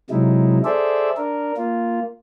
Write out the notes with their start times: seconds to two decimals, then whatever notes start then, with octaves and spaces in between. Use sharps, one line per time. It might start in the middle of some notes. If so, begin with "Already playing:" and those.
0.10 C3 F#3 G#3 D#4 E4
0.65 G#4 A4 C5 D5 E5
1.17 D4 A#4
1.57 A#3 F4